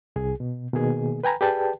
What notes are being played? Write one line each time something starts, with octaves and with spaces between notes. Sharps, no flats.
C2 G#4
B2
B2 D#3 A#3 G#4
B4 G5 G#5 A#5 B5
G4 G#4 B4 D5 G5 A5